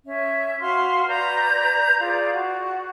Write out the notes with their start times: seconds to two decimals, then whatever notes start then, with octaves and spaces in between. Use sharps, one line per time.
0.06 C#4 E5
0.60 F#4 F5 C6 F6
1.07 B4 D5 A#5 G6
2.00 F4 G#4 D5 F5
2.33 F#4